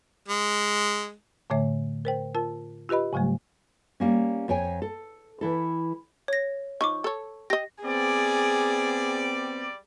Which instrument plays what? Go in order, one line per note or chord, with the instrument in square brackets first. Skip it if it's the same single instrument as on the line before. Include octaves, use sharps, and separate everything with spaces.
[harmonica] G#3
[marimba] A2 D3 A3 C#5 E5
A#4 C5 G5
F4 A#4 A5
F4 G4 B4 D#5 B5
G#2 C#3 F#3 G3 A3
[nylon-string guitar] G3 A#3 C#4
F2 C#5 G5 G#5
A4
E3 E4 A4
[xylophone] C#5 A#6
[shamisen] F3 D#4 [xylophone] C#6 D6
[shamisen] A4 C#5
[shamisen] G4 D#5 [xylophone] A#6
[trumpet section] G3 D5 [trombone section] B3 C4 [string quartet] G#4